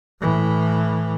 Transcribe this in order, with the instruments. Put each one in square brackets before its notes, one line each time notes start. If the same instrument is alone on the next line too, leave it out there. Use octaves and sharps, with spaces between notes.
[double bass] A2 E3